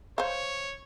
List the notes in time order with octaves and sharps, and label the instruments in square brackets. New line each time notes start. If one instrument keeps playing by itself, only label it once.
[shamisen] C5 F5 [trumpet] C#5